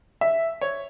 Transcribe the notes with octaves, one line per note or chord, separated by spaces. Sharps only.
E5
C#5